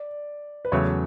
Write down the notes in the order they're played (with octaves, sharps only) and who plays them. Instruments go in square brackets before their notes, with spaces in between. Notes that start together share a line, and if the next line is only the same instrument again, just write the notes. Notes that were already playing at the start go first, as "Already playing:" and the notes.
Already playing: [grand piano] D5
B4
[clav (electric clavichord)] E2 C#3 F#3 A3 [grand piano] C#5